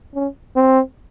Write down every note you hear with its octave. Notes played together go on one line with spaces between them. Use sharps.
C#4
C4